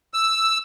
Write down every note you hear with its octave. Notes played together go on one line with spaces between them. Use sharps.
E6